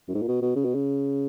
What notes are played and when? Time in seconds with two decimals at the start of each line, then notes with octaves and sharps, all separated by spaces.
0.08 F#2
0.14 G#2
0.22 A#2
0.28 B2
0.42 B2
0.56 C#3
0.65 B2
0.75 C#3